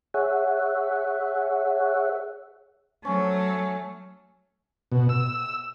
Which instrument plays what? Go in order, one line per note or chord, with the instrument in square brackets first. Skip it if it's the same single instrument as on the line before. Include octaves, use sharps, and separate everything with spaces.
[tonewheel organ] G#4 C#5 E5 F#5
[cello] F#3 A3 [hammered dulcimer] C#4
[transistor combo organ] B2
E6